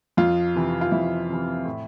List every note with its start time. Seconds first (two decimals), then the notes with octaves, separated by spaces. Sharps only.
0.17 F2 F4
0.55 C3 E3
0.81 F4
0.92 F2 E4
1.29 C3 E3
1.65 A2